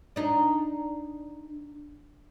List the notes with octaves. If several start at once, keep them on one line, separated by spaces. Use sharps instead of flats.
D4 D#4